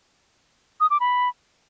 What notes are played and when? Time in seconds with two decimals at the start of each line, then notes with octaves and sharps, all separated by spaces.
0.80 D#6
0.90 D6
1.00 B5